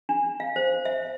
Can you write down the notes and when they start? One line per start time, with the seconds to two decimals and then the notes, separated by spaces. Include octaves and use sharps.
0.09 D4
0.40 F5
0.56 C5
0.85 E5